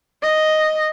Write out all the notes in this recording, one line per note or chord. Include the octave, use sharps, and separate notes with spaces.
D#5